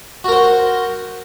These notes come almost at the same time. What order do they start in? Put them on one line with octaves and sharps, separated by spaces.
F#4 A#4 C5 F#5